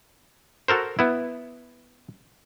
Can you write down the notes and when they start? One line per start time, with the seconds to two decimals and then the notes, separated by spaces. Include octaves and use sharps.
0.68 F#4 A4 A#4 C5
0.99 B3 E4